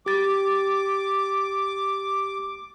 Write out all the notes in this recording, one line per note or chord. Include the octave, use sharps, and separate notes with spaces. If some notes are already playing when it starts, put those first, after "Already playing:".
G4 D6 A6